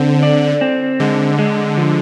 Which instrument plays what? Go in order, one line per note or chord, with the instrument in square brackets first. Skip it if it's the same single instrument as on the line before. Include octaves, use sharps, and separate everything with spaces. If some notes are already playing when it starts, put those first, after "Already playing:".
Already playing: [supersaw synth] D3 [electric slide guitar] C4
[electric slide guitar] D5
C4
[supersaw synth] D3 [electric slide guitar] G#3
[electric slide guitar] G#3
F3